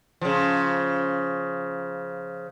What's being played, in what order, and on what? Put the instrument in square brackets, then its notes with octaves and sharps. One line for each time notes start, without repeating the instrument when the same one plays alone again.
[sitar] C#3 F3